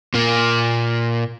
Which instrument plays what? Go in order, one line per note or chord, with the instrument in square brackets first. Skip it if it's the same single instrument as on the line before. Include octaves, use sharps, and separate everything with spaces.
[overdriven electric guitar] A#2 A#3